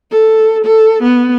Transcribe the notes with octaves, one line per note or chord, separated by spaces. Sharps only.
A4
A4
B3